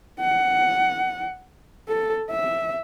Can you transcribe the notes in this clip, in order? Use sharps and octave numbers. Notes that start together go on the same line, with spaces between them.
F#5
A4
E5